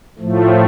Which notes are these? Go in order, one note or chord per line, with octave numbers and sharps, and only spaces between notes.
A2 F3 A3